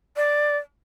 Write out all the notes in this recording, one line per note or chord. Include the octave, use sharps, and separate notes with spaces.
D5